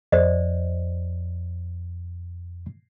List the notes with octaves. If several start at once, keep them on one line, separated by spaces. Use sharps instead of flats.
F2 C5 D5 D#5